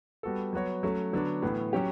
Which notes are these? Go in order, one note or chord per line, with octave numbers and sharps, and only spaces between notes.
G3 B3 F#4 A4
F#3 B3 F#4 C#5
F#3 A3 C#4
D3 F#3 B3 D4
A2 E3 B3
F#3 C#4 G4